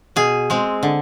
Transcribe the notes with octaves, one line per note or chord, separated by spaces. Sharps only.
B2 G#4
G#3 C4
D3